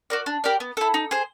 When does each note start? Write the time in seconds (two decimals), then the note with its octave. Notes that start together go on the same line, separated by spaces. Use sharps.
0.10 F#4 A#4 D5
0.26 D4
0.44 G4 A#4 D5
0.60 B3
0.77 E4 A4
0.94 D#4
1.11 G#4 C5